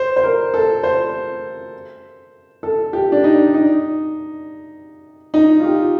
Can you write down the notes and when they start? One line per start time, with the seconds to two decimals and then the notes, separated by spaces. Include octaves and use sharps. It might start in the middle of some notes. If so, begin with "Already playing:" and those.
Already playing: C5
0.16 C5
0.23 A#4
0.54 A4
0.83 C5
2.63 A4
2.93 G4
3.12 D4
3.24 D#4
3.54 D#4
5.34 D#4
5.59 F4
5.64 G4